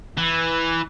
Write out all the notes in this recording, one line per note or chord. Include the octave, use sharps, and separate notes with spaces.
E3